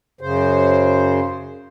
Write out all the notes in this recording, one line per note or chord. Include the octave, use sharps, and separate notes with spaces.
F#2 C#3 C5